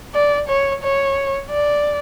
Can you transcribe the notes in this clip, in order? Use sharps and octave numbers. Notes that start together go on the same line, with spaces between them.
D5
C#5
C#5
D5